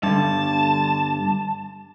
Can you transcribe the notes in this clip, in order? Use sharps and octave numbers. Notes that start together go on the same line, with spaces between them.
G2 D3 A5